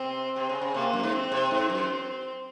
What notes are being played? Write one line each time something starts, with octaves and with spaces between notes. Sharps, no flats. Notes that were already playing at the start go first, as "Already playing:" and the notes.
Already playing: C3 C4
C3 C4
C#3
C#3
C3 A#3
F#2
G#2
C4
C3
G#2 C4
F#2